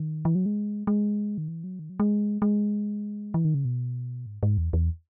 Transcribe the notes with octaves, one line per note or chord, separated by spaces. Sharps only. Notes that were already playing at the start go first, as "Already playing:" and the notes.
Already playing: D#3
E3
F#3
G#3
G#3
D#3
E3
F#3
D#3
F#3
G#3
G#3
E3
D#3
C#3
B2
G#2
G#2
E2
E2